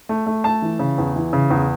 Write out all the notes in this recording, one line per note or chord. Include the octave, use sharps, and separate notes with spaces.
A3
A3
A3 A5
E3
C#3
E2
E3
C#3
E2